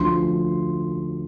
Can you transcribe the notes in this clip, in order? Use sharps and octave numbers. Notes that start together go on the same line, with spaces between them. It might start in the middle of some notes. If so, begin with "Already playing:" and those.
Already playing: D2 D3 F3 C6